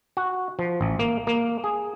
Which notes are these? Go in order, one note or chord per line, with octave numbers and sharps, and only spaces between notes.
F#4
F3
A1
A#3
A#3
G#4